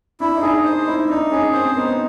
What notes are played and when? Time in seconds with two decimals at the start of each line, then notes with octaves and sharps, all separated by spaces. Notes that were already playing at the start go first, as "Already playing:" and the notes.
0.20 D4 E4
0.37 D#4
0.42 D4 G#4
0.64 D#4 C5
0.87 D#4 E4
1.09 D4 D#4
1.31 C#4 G#4
1.53 C4 C5
1.76 B3 D#4